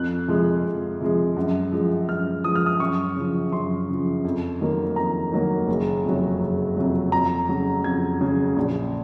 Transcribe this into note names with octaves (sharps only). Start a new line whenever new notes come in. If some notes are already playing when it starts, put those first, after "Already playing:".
Already playing: F2 F#6
C3 F3 G#3
F2
C3 F3 G#3
F#2
F3 G#3
F#2 F6
F3 G#3 D#6
F6
D#6
F#2 C#6
C#3 F3
F#2 C6
C#3 F3
F2
D#3 F#3 A#3
F2 A#5
D#3 F#3 A#3
F#1
F2 C3 F#3
F#1
F2 C3 F#3
F2 A#5
C#3 F#3
F2 G#6
C#3 F#3
A#1